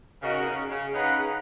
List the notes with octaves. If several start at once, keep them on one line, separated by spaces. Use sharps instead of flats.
C#3 D#4 F#4 A#4 D#5 F#5
B2
C#3
C#3
C#3 D#4 G#4 B4 F#5